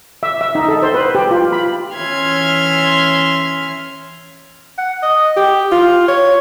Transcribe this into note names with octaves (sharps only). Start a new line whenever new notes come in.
E5
E5
D#4
A4
C5
B4
G4
F4
B5
E3 C#4 E5 C6 F6 G#6
F#5
D#5
G4
F4
C#5